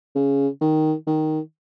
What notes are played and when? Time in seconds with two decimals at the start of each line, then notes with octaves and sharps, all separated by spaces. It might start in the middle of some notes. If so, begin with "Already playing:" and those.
0.15 C#3
0.61 D#3
1.07 D#3